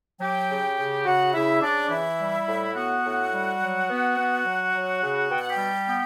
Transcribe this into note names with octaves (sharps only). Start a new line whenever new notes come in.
F#3 G4 G5
C#3
C#3
C#3 F#4 F#5
C#3 E4 E5
C#3 D4 D5
E3 E4 E5
G3
A2
B3 F#4 F#5
A2
G3
F#3
B3
B3
F#3
F#3
C#3
B2 G5
F#5
G4 G5
G3
B3